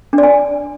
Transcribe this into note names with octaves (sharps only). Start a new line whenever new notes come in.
D4
D5
G#5